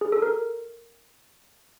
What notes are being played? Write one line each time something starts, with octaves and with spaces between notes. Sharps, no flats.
G#4
A4
A#4